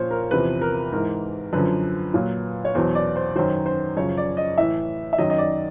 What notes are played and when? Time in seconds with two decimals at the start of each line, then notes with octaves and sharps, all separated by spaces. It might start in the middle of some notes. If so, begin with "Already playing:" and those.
Already playing: A#2 F3 C5 C#5
0.11 A#4
0.31 E2 C3 F3 B4
0.61 A#4
0.92 G#2 E3 A#4
1.53 F#2 D3 F3 B4
2.14 A#2 F#3
2.65 C#5
2.75 E2 B2 F#3 C5
2.95 D5
3.16 C5
3.36 F#2 D#3 F#3 C5
3.66 C5
3.97 F#2 C#3 F3 C#5
4.17 D5
4.37 D#5
4.58 A2 E3 E5
5.13 E5
5.18 F#2 D#3 F#3 D#5
5.30 D#5
5.38 D5